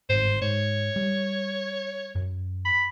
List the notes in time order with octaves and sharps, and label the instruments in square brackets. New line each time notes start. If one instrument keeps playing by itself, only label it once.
[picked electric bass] G1 G#2 [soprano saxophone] C5
[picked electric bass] G#2 [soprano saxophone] C#5
[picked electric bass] G3
F#2
[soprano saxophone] B5